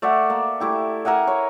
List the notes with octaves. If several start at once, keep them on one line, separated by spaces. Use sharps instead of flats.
A3 D5 E5 F#5
A#3
A3 E4 G4
A#4 E5 F#5 G#5
C#5